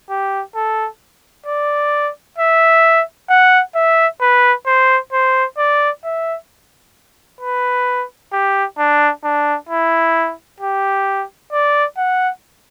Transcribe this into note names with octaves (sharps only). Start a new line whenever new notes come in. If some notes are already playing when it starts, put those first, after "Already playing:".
G4
A4
D5
E5
F#5
E5
B4
C5
C5
D5
E5
B4
G4
D4
D4
E4
G4
D5
F#5